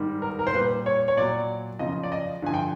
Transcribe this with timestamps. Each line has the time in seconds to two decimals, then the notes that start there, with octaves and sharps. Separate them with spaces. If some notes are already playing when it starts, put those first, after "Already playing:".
Already playing: G#2 D#3 G3
0.22 A#4
0.39 A#4
0.47 C5
0.53 A#2 G3 B4
0.86 C#5
1.08 C#5
1.17 A#2 F#3 D5
1.79 F#2 C#3 F3 D#5
2.03 D5
2.12 D#5
2.42 G2 D3 F3 G#5
2.54 G5